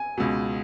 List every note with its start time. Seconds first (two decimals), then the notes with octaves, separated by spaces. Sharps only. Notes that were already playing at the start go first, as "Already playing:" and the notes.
Already playing: G#5
0.17 C#2 B2